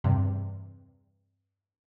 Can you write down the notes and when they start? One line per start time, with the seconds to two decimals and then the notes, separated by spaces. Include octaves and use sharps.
0.04 E2 G2 C3